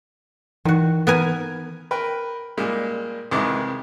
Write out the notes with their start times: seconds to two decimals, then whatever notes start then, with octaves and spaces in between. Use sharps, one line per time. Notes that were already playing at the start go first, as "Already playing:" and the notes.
0.65 D#3 E3 F#4
1.07 B3 A#4 G#5
1.91 A#4 B4 G5
2.57 A#2 G3 G#3 A#3
3.31 C2 F2 D#3 E3 G#3 D6